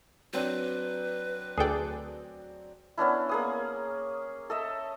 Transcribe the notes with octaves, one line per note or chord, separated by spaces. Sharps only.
F#3 C4 D4 B4
D2 G#4 A4 D5 G5
B3 C#4 D4 E4
A#3 G#4 D#6
A4 D#5 E5